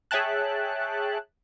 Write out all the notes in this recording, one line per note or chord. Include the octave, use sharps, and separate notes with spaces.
G#4 C#5 E5 G5 A5 F#6